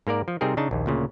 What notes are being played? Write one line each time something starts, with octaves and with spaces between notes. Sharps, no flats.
G#2 A#3 A#4 D5
F3
C3 G3 C4 D#4 G#4 A#4
C#3 D4 D#4 A5
A#1 D#2
D2 A#2 C#3